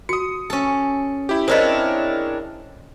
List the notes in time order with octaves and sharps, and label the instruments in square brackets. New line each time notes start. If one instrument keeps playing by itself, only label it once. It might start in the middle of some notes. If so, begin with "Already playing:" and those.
[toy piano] F#4 [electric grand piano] D#6 C#7
[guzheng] C#4 A4
[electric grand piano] E4 G4
[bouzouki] C4 D4 E4 [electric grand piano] G#4 A#4 C#5 [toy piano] C5 D#5